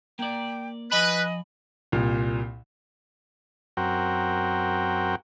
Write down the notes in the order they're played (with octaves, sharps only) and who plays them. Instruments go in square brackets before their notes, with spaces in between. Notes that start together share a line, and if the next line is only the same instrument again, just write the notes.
[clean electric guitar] A#3 D5 [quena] G5
[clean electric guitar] F3 G#5 B5 [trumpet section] B4 [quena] D#5
[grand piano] C2 A#2
[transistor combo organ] F#2 C4 F#4 A#4 G5